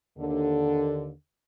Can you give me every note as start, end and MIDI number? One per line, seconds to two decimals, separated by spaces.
0.18 1.10 39
0.18 1.10 50